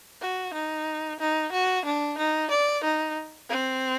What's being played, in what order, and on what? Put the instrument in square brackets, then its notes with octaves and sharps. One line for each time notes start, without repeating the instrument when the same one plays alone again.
[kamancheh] F#4
D#4
D#4
F#4
D4
D#4
D5
D#4
C4